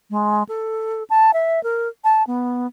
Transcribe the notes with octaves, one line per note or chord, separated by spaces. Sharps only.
G#3
A4
A5
E5
A#4
A5
B3